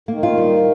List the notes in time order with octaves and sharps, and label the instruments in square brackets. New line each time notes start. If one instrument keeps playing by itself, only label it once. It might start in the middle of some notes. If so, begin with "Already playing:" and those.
[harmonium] D#3 [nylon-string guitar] A#3
[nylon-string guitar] F4
G3